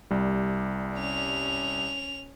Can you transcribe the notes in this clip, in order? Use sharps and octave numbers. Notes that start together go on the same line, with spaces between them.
C2 G3
C#4 F7